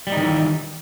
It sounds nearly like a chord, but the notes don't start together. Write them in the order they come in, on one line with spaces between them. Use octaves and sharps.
G3 D#4 D#3 E3